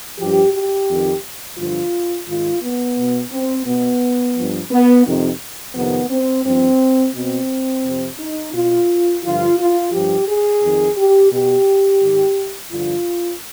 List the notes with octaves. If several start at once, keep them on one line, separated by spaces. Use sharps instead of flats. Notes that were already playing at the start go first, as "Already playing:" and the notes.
G2 F3 G4
G4
F2 D#3
G2 D3 F3 F4
G#2 D#3 F4
B3
B2
C4
B2 B3
G2 F3
B3
F2 C3 D#3
F2 C3 D#3 B3
C4
G2 F3 C4
B2 C4
F2 C3 F3
D#4
B2 F4
G2 D3 F3 F4
F4
G2 F3 G4
G#4
F2 D#3
G4
B2 G4
G#2 D#3
G2 D3 F3 F4